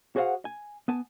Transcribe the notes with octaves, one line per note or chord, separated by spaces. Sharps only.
F#4 G#4 C5 D5 F5 F#5
G#5
B3 G#5 A5